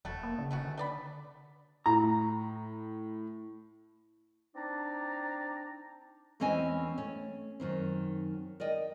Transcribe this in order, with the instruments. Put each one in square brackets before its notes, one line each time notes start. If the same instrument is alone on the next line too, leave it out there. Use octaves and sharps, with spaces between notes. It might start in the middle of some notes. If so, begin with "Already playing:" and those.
[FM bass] E1 [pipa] A3 F#4 A4
[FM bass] A#3
C#3
[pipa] A3 C#4 F#4
[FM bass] D3
[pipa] A3 D5 B5
[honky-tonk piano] A2 [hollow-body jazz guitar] A#5
[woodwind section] C4 D4 D#4 D5 A#5
[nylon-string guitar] E2 E3 C4 C#4 D#5 G#5
A3 C#4
F#2 D#3 C4
A#4 D5 D#5 G5